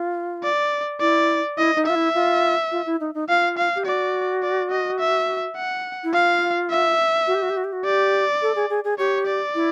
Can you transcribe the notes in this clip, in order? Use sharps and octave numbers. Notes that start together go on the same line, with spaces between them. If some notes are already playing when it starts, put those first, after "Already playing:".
Already playing: F4
D5
E4 D5
E4 D#5
D#4
F4 E5
E4
F4
F4
E4
D#4
D#4
F4 F5
F5
G4
F#4 D5
D5
D#5
E5
F#5
E4
F4 F5
E5
F#4
G4
F#4
G4
F#4
G4
F#4
G4 D5
A4
G#4
G#4
G#4
G4 C#5
D5
E4